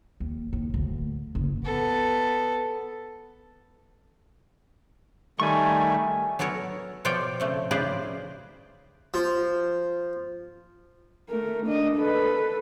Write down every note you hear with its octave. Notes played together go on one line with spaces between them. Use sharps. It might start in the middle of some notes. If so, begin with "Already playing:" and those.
D#2
D#2
D2
F#1
B3 A4
D#3 G3 A3 G#5 C#6
F#3 B3 A4 A#4 C#5
B2 F3 F4 C#5 D5 G5
C#3 A3 C4
C#3 F4 G#4 B4 C5 D5
F3
A3 A#4
D4 D#5
A4 B4